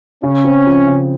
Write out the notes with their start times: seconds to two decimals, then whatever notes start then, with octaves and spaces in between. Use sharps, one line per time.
0.23 C#3 C#4
0.44 C4
0.66 F3
0.87 C#3